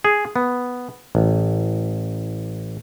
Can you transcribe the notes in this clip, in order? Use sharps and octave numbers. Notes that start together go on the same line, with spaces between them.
G#4
B3
A1